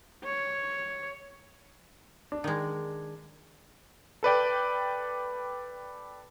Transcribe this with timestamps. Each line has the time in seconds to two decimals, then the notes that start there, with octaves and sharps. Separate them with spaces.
0.24 C#5
2.32 D4
2.44 D#3 G#3
4.23 A4 B4 D5 G5